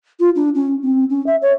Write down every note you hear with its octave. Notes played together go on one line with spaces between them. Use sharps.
F4
D4
C#4
C4
C#4
E5
C#5